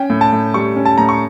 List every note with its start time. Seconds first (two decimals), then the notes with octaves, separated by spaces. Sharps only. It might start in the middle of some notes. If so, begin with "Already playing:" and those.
Already playing: C#4 G5
0.10 A2
0.21 A5
0.32 A2
0.54 G3 C#6
0.76 C#4
0.85 A5
0.98 A2 A#5
1.09 C#6